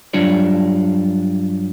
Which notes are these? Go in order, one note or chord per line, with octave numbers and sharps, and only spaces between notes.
G2 F#3 D4 F4 C#5 D5